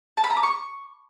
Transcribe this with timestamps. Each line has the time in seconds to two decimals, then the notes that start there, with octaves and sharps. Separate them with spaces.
0.17 A5
0.24 B5
0.30 A#5
0.37 D6
0.43 C#6